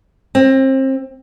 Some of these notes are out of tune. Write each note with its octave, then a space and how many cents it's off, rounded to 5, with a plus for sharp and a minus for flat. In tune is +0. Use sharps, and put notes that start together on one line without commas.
C4 +30